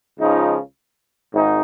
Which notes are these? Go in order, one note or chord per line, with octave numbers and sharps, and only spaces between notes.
C#2 C#3 F3 D#4
G#1 G#2 D#4